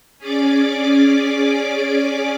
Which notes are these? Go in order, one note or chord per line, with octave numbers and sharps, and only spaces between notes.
C#4 G#4 D5 D6